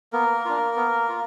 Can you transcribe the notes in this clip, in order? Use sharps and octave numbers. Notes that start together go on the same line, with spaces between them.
A#3 B3 A#4
D4 F4
B3
F4